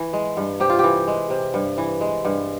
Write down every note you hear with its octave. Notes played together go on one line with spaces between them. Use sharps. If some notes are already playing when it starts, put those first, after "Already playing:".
Already playing: E3
G#3
G2
C3 G4
F4
G4
E3
G#3
C3
G2
E3
G#3
G2